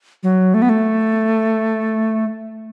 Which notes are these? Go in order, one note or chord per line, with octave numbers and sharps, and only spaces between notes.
F#3
A3
B3
A3